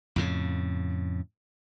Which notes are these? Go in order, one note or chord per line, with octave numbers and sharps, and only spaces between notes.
F2 A2 C#3